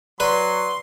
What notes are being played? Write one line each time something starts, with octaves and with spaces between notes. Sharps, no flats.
F#3 B4 D5 C6